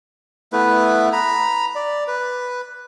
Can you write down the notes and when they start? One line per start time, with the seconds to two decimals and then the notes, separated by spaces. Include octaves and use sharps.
0.53 A3 B3 E4 B4
1.13 A#5 B5
1.75 D5
2.08 B4